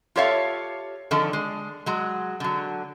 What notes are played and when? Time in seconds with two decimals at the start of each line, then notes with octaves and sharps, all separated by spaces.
0.16 F4 G4 A4 C#5 E5 F5
1.11 D3 D#3 F3 A4
1.33 G#3
1.86 F#3 G#3
2.40 D3 F#3